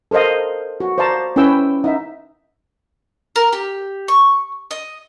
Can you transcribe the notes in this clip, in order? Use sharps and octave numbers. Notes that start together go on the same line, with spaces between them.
A4 A#4 C5 D#5 F5
F#4
C5 D5 F5 A5 A#5
C#4 E4 B4 G5 E6
D#4 E5
A#4
G4
C#6
D#5